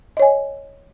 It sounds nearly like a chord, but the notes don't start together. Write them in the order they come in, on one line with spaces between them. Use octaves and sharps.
D#5 C#5 G#5